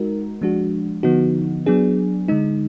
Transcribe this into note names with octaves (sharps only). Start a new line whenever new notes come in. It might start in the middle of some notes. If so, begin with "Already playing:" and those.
Already playing: G#3 D#4 F#4 A#4
F3 G#3 D4 F#4
D3 F3 B3 D#4 F#4
F#3 B3 D4 G#4
D3 G#3 D#4